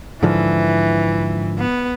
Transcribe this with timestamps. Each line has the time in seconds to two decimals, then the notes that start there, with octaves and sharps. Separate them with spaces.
0.23 G#2 D3 E3 F3
1.58 B3